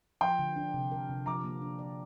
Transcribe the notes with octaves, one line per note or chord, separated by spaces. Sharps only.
F3 G5 C6
D3
D4
C3
A#4
C3
F3 A#5 D6
A#3
D4
D5